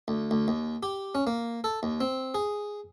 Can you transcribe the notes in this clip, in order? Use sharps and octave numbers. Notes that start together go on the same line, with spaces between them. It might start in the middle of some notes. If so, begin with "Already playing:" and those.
D2
D2
D#2
G4
C#4
A#3
A4
D#2
C4
G#4